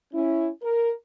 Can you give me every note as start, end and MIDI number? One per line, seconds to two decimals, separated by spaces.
0.14 0.49 61
0.14 0.49 64
0.62 0.92 70